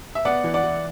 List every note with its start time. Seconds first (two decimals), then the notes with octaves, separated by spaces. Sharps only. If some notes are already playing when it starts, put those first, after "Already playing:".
0.15 E5
0.25 B3 D5 F#5
0.44 E3
0.54 D5 F#5
0.64 E3